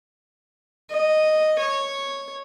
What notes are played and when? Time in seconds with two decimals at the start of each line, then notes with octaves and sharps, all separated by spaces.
0.90 D#5
1.58 C#5